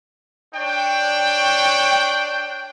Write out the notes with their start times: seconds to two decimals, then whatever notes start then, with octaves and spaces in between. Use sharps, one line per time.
0.54 D4 C#5 G5